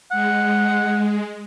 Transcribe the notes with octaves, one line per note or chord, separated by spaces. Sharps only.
G#3 F#5